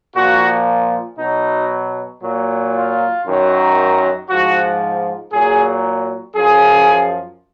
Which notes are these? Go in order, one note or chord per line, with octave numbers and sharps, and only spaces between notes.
A#2 F3 F#4
B2 F#3 D#4
A#2 F#3
F4
F#2 D#3 F#3
G#2 F3 F#4
A#2 F#3 G#4
F#2 F3 G#4